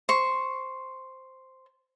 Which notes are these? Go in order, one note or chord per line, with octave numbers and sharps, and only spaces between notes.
C5 C#6